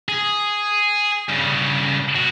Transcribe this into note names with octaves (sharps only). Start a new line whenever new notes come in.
G#4
G2 C#3
B2 F#4